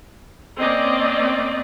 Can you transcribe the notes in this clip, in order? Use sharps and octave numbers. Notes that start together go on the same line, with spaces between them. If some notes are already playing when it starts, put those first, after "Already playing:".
A#3 C4 C#4 D5 D#5